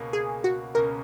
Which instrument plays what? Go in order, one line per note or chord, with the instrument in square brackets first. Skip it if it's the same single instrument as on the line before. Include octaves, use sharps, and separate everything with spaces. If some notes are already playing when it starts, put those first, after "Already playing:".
Already playing: [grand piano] C#2 B2 A#3 C#4
[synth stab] G#4
F#4
[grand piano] C#2 B2 A#3 C#4 [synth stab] A#4